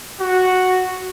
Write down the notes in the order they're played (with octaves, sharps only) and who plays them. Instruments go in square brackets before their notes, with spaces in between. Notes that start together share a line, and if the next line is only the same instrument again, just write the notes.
[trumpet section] F#4